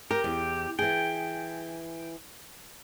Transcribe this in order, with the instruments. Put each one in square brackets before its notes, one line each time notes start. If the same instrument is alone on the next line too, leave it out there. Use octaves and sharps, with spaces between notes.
[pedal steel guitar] G4 [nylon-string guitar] A#4
[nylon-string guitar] E2
[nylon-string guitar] E3 G#4 [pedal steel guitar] G5